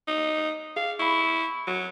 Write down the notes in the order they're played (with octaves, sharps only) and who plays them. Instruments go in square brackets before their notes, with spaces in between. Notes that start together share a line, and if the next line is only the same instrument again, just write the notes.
[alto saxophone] D#4
[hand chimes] G#4 [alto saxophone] F5
[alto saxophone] E4 [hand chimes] B5 C#6
[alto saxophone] F#3